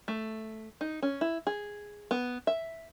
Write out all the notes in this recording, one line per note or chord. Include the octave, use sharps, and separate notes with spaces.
A3
D#4
C#4
E4
G#4
B3
E5